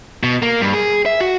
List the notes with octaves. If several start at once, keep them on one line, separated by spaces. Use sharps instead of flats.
B2
A#3
G2
G#4
E5
F#4